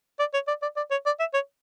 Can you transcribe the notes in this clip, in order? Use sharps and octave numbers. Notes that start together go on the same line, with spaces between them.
D5
C#5
D5
D5
D5
C#5
D5
E5
C#5